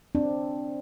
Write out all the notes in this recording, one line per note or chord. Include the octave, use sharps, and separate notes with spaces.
C4 D4